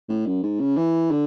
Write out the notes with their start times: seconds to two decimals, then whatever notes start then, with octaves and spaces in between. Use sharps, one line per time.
0.09 A2
0.26 F#2
0.43 G#2
0.60 C#3
0.77 E3
1.11 D3